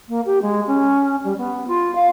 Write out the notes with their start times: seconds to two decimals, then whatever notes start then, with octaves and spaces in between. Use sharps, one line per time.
0.08 A#3
0.25 G4
0.41 G#3
0.66 C#4
1.24 G3
1.37 B3
1.67 F4
1.95 F5